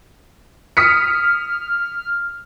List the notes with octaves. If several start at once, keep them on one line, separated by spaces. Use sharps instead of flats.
D#6 F6 B6 C#7